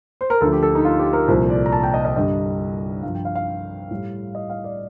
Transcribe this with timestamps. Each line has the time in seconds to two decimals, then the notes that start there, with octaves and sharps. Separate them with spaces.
0.21 C5
0.30 A#4
0.41 D2 D3 F3 A4
0.52 G4
0.63 A4
0.75 D#4
0.85 F4
0.99 G4
1.13 A#4
1.28 C2 A#2 F3 C5
1.50 D5
1.66 A#5
1.73 A5
1.83 G5
1.94 D#5
2.05 D#5
2.16 G2 D3 G3 D#5
3.03 G2 F3 F5
3.15 G5
3.25 F5
3.35 F5
3.91 A2 G3
4.35 D#5
4.50 F5
4.64 D5